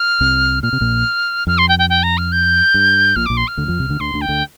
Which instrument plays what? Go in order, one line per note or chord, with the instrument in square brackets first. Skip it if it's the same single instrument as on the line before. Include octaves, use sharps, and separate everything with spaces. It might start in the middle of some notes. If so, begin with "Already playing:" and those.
Already playing: [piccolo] F6
[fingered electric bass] C2 C3
[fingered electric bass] A#2 [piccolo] F6
[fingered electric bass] C3
A#1 A#2
[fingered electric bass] F2 [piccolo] F6
[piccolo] C6
G5
G5
G5
A#5
F6
G6
[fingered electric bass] G2
[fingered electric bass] A#1 A#2 [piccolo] F6
[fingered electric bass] A#1 A#2 [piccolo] D6
[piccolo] C6
F6
[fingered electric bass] D2 D3
F2 F3
C2 C3
D2 D3
[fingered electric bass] D2 D3 [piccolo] C6
[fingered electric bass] D2 D3
[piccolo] G5
[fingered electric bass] D2 D3